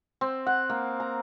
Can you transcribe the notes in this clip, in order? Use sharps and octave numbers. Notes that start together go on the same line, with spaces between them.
C4
F#5
A#3
A#5